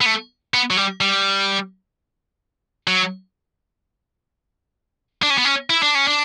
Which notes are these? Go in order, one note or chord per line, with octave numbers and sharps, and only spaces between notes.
B3
A3
B3
F#3
G3
G3
F#3
D4
C#4
B3
C#4
E4
D4
C#4
D4